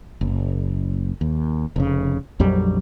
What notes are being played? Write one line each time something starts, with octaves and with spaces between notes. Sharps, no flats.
F#1
D#2
F1 C#3
A#1 F2 F#3 G3